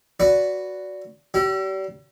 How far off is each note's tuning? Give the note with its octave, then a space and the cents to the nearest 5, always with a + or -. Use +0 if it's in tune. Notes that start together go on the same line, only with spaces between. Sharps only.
F#4 +0 B4 +0 D5 -20
G3 -40 G4 -40